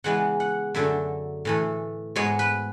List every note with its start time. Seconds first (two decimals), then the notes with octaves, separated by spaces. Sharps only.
0.04 C#3 E3 G#3 B3 F#5
0.40 F#5
0.74 F#2 D3 F#3 A3 E5
1.45 A2 E3 A3
2.16 G#2 G#3 B3 C#5
2.39 B4